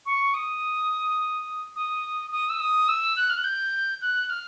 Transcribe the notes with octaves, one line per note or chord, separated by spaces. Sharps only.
C#6
D#6
D#6
D#6
E6
D#6
E6
F#6
F6
F#6
G6
F#6
F6